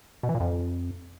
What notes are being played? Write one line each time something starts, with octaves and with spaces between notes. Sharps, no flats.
B2
E3
A#2
F2